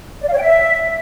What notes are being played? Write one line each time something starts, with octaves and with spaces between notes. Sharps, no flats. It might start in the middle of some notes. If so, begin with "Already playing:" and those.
D5
F5
C#5
G5
E5